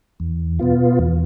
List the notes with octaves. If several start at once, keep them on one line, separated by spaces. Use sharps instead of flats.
E2
B2 B3 F4
E2